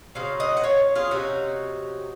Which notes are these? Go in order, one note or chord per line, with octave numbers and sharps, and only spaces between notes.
C#3 F#3 C4 F5
D#5 F#5
F#5
C#5 F5
F4 G#4
C3 F#3 C#4 D#4 F#4